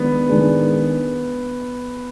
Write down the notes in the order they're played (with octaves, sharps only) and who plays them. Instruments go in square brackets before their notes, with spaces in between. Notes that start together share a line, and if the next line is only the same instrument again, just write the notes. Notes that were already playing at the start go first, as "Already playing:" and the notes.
Already playing: [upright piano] D#3 G#3 D4 [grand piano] B3
[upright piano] D#3 G#3 D4 G#4